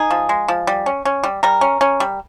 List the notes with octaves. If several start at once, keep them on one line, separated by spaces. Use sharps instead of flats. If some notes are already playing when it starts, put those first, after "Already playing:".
Already playing: D#4 G#4
F3
G#3
F3
G3
C#4
C#4
G3
G3 A#4
C#4
C#4
G3